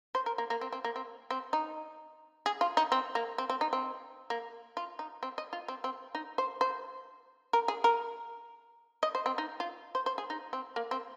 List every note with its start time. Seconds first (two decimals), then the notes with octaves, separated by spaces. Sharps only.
0.15 C5
0.26 A#4
0.38 A#3
0.50 A#3
0.61 C4
0.73 C4
0.85 A#3
0.96 C4
1.31 C4
1.53 D#4
2.46 G#4
2.61 F4
2.77 D#4
2.92 C4
3.15 A#3
3.38 C4
3.50 C4
3.61 D#4
3.73 C4
4.30 A#3
4.77 F4
4.99 D#4
5.23 C4
5.38 D#5
5.53 F4
5.68 C4
5.84 C4
6.15 D#4
6.38 C5
6.61 C5
7.53 A#4
7.68 G#4
7.84 A#4
9.03 D#5
9.15 C5
9.26 C4
9.38 D#4
9.60 F4
9.95 C5
10.06 C5
10.18 G#4
10.30 D#4
10.53 C4
10.76 A#3
10.91 C4